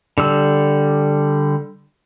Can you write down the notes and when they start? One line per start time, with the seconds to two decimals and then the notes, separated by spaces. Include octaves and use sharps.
0.18 D3 G3 E6